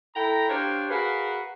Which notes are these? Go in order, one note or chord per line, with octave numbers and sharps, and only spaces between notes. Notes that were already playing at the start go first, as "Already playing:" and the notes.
E4 A4 G5 A#5
D4 G4 C5 C#5 F5 G5
F#4 G#4 A#4 B4 F5 F#5